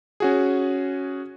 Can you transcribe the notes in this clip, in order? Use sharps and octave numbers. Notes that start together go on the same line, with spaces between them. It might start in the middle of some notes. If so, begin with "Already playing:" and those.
C#4 F#4 G#4